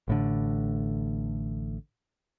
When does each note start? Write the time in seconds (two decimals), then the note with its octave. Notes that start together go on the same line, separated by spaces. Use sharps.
0.08 A1 A2 D3